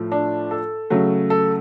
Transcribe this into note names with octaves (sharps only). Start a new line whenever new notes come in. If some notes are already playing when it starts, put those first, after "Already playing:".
Already playing: A2 F3 A3
D4
A4
C#3 F#3 A3
A4